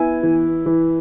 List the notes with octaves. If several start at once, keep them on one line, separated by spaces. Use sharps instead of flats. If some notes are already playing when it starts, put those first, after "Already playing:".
Already playing: B3 E4 G#5
E3
E3